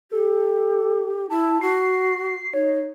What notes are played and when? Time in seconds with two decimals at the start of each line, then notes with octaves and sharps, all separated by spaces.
0.11 G4 A4
1.30 E4 A5
1.61 F#4 C7
2.54 D#4 C#5